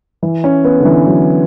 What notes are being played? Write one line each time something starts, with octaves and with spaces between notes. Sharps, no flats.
E3
C#4
B3
D3
E3
F#3